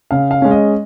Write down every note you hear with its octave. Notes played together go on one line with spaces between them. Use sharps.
C#3 F5
F5
G#3 C#4
D#5